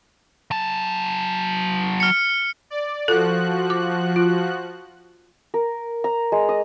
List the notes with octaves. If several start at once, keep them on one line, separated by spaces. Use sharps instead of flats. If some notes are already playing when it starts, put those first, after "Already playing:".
F#3 A5
F6 C#7
D5
F3 F#4 A4 F#6
D6
F4
A#4
A#5
G#3
D#5